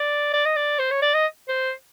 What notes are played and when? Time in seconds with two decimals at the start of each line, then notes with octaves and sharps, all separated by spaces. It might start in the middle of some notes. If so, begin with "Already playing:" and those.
Already playing: D5
0.34 D5
0.45 D#5
0.56 D5
0.79 C5
0.91 C#5
1.02 D5
1.14 D#5
1.48 C5